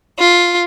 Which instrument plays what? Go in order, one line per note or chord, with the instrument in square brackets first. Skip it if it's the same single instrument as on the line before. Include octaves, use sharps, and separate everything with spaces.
[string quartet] F4